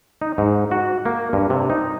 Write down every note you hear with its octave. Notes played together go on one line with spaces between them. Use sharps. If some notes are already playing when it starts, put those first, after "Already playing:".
D#4
G#2
F#4
A#3
G2
C3
D#4